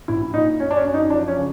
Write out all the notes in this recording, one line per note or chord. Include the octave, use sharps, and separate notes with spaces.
A#1 E4
A#2 D#4
F#2 C#4
D4
C#4
F#2
D#4
F3 D4
C#4
C#3